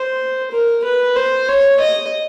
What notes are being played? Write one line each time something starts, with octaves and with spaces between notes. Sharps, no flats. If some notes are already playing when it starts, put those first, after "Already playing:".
Already playing: C5
A#4
B4
C5
C#5
D#5